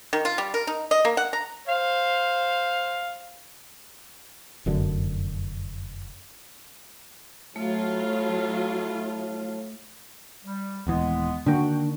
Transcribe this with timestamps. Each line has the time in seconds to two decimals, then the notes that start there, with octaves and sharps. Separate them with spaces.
0.13 D#3
0.25 F4
0.38 G3
0.54 A#4
0.67 D#4
0.91 D#5
1.05 A#3
1.17 F#5
1.33 A#5
1.67 C5 F5
4.66 F1 F#2 D3
7.56 A2 F#3 A3 F4
10.45 G3
10.87 D#1 D#2 E3 G#3 B3
11.46 D3 D#3 A#3 D4 F#4 G5